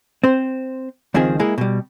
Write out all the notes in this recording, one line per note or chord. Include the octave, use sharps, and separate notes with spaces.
C4 C5
C#2 D#3 F3 C4 G#4
G#3 A#3 E4 G#4
B2 G3